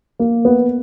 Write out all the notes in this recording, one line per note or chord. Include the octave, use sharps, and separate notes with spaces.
A#3
B3